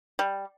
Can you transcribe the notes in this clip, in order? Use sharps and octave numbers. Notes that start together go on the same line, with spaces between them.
G3